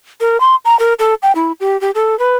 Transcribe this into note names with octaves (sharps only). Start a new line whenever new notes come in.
A#4
C6
A#5
A#4
A4
G5
E4
G4
G4
A4
B4